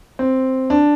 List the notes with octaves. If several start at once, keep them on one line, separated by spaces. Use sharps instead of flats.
C4
D4